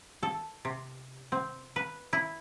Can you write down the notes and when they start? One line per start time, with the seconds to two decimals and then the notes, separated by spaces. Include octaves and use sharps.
0.23 A4
0.65 C3
1.32 C4
1.76 B4
2.13 E4